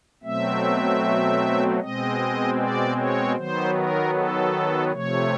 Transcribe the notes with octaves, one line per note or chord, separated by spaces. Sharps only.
B2 F#3 A3 C4 E5
B2 G#3 C4 D#5
D5
C#5
D#3 F#3 B3 C5
A#4
A4
C3 F3 A3 C#5